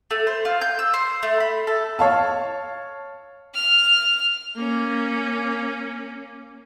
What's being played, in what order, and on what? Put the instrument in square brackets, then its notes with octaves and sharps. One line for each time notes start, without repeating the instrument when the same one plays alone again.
[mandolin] A3
C5
F4
G6
E6
C5
A3
B5
A4
[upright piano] C#5 F5 A5
[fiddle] F6
[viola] A#3 C#4